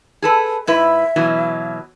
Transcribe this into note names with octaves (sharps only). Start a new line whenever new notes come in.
G#4 A4 B4
G#2 E4 B4 E5
B2 E3 F#3